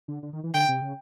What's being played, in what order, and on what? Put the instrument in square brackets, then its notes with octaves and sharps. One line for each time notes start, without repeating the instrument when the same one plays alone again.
[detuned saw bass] D3
D3
D#3
E3
[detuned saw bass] D3 [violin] G5
[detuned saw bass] C3
C#3